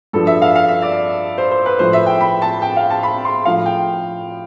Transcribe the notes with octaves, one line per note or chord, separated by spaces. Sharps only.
G2 F3 A4
E5
F5
F5
E5
D5
C5
C5
B4
A2 F3 C5
E5
G5
B5
A5
G5
F5
A5
B5
C6
A2 F3 F5
G5